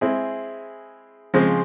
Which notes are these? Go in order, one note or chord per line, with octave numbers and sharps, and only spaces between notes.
G#3 C4 E4 G#4
C#3 F3 G#3 C4